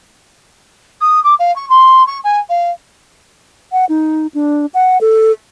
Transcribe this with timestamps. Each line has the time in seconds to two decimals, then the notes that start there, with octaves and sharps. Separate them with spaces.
1.01 D#6
1.24 D6
1.39 F5
1.56 C#6
1.69 C6
2.07 C#6
2.24 G#5
2.49 F5
3.72 F#5
3.89 D#4
4.34 D4
4.74 F#5
5.01 A4